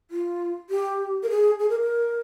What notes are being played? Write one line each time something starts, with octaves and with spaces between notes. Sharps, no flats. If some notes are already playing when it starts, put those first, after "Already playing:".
F4
G4
A#4
G#4
G#4
A#4
A#4